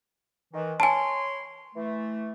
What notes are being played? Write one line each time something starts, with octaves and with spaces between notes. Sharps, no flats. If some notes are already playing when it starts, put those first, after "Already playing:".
D#3 E3
C#5 G#5 A5 B5 C6
E3 A3